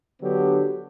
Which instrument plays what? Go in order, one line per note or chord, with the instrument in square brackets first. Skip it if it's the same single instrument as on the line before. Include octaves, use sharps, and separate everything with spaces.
[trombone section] D3 F#3 B3 D4 G4